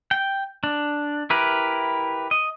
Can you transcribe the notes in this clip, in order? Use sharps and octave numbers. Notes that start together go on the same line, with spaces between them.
G5
D4
E4 G4 A#4 B4
D#5